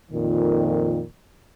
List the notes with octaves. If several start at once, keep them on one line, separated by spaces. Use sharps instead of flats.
F2 A#2 D#3